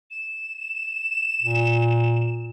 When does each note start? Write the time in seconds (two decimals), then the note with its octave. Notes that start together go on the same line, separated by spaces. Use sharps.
0.11 E7
1.42 A#2